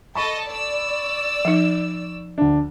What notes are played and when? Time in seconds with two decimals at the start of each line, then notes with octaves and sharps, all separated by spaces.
0.15 A4 D#5 A5 B5 C#6
0.49 D5 E6
1.45 F3 D#4
2.38 D2 D4